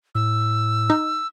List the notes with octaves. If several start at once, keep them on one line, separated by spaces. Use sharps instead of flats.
A2 E6
D#4